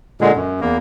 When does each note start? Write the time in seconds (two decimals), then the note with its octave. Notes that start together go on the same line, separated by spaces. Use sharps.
0.21 A#2 D3 G#3
0.36 F#2
0.61 E2 A#3